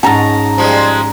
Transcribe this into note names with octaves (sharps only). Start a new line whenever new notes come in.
G#2 C#4 A5 A#5
F3 G3 G#3